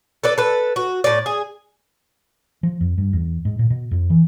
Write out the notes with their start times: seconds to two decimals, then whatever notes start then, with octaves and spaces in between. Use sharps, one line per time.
0.24 A4 B4 D5
0.38 A4 B4
0.76 F#4
1.04 A2 D5
1.26 G#4
2.63 F3
2.81 F2
2.98 G2
3.13 E2
3.45 G#2
3.59 A#2
3.70 B2
3.91 F2
4.10 E3